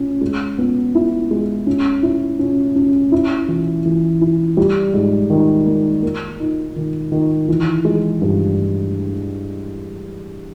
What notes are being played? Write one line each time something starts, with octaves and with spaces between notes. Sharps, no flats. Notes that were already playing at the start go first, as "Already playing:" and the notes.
Already playing: C#4
G#3
B3
E4
G#3
C#4
E4
C#4
C#4
E4
E3
E3
E4
G3
G#2
D#3
A#3
A#3
D#4
D#3
D#3
E3
G#3
G2